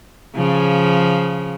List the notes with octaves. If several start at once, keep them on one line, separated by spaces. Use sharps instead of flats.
C#3 F3